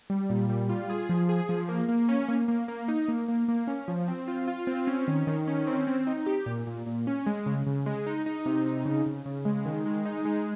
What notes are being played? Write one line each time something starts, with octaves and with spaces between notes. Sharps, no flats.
G3
A#2
G3
F4
G#4
F3
G#4
F3
A#3
A#3
C#4
A#3
A#3
A#3
D#4
A#3
A#3
A#3
C#4
F3
C4
F4
F4
C4
C#4
D#3
D#3
C#4
C4
C4
D#4
G4
A#2
A#2
A#2
C#4
G#3
C#3
C#3
G#3
D#4
D#4
C3
D#4
C#3
C#3
C#3
G#3
D#3
G#3
D#4
G#3